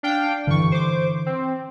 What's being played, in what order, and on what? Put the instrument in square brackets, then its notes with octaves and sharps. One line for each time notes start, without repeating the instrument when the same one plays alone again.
[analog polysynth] D4 F5 G5
[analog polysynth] G2 C#6 [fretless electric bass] D3 E3
[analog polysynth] C5 D6
C4